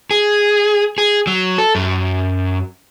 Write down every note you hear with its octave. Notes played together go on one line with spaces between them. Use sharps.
G#4
G#4
F#3
A4
F#2